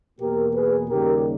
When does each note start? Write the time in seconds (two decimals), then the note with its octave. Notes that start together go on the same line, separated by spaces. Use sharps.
0.19 E2 B2 A#3 G4 A#4
0.54 G#4 B4
0.89 D#2 C#3 G3 G4 A#4